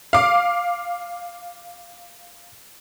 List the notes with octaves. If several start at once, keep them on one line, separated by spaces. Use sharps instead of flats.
F5 D6